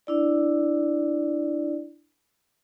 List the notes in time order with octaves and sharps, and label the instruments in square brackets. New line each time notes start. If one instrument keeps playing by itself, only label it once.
[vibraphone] D4 E4 D5